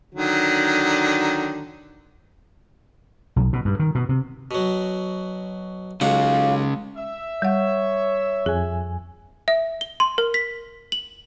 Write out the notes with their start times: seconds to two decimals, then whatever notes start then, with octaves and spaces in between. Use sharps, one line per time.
0.15 D3 D#3 F#3
3.36 B1
3.53 B2
3.65 G2
3.79 D#3
3.95 B2
4.09 C3
4.51 B2 F#3
6.01 B1 C#3 G#3 F5 F#5
6.97 E5
7.42 G3 C#5 F#5
8.46 F2 G#4 G#5
9.48 E5
9.81 G7
10.00 C6
10.18 A#4
10.34 B6
10.92 F#7